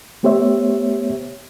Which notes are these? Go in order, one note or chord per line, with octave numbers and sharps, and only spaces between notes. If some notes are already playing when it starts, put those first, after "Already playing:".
A3 B3 G4 C5 C#5 E5